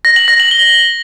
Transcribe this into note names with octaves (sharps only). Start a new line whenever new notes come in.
A#6
F#7
A#6
F#7
G7